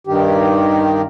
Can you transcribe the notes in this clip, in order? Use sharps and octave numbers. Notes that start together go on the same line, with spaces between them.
G2 D#3 G4